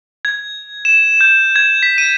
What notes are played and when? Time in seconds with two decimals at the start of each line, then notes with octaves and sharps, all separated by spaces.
0.25 G#6
0.85 E7
1.21 G6
1.56 G#6
1.83 B6
1.98 D#7